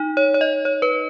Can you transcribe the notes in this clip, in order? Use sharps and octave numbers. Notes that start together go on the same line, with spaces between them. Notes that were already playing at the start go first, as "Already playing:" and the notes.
Already playing: D#4
C#5
C#5
D#5
C#5
B4